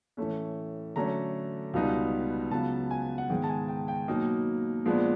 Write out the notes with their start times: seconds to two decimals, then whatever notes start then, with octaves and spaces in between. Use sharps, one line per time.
0.17 A2 E3 A3 C#4
0.96 D3 F#3 A3 C#4 A#5
1.74 C#2 B2 G3 B3 D#4
2.51 C#2 C#3 F#3 B3 A5
2.91 G#5
3.18 F#5
3.29 G#2 D#3 G#3 B3 G5
3.43 A5
3.49 G#5
3.68 G5
3.88 G5
4.08 B2 F#3 A#3 D#4
4.85 A#2 F3 G#3 B3 D4